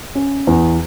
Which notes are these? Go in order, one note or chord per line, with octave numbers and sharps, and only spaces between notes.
C#4
E2